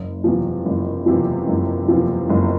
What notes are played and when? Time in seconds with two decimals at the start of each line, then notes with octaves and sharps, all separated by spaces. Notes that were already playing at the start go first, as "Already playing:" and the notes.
Already playing: F#1
0.24 E2 C3 F3
0.65 F#1
1.06 E2 C3 F3
1.48 F#1
1.88 E2 C3 F3
2.30 F#1